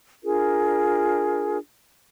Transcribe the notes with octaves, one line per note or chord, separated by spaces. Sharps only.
D4 F4 G#4 A#4